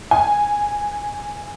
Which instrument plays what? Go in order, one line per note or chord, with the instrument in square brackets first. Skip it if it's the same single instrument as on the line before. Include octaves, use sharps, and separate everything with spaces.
[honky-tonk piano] G#5